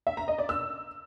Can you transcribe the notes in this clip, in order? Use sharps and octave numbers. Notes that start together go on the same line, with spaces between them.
E5
A#5
D#5
D5
E6